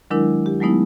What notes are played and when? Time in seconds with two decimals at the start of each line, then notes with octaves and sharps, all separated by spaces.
0.11 D#3 F#3 G#3 D4 E4 A#4
0.46 G4
0.61 F#3 G#3 A3 B3 D#4 E4